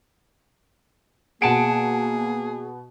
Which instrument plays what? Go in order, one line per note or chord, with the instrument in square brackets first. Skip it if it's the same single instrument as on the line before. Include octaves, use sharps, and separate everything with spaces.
[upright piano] B2 D7 [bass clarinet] A#3 [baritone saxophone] G#4 [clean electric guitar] F#5 A5